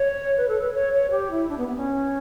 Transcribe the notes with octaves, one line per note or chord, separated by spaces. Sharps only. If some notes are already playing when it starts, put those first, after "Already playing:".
Already playing: C#5
B4
A4
B4
C#5
C#5
G4
E4
D4
B3
B3
C#4